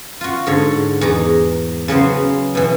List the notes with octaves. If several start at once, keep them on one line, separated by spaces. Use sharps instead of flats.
F4 F#4
G#2 D3 C#5
E2 D#4 A#5
C#3 F#3 B3 C5
B2 E3